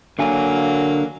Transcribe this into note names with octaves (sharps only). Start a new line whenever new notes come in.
D3 F#3 A#3 F5 G#5